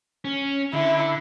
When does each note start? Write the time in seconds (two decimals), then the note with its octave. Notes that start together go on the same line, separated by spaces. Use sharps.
0.25 C#4
0.74 D3 E4